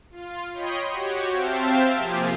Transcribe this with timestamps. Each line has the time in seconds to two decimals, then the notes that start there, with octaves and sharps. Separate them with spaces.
0.11 F4
0.53 C#5 D#5 G5 B5 C6 D#6
0.89 F#4 G4 C#5
1.30 C4 C5 E5 F5 G5 A5
1.94 C3 F3 A#3 F4 G4 G#4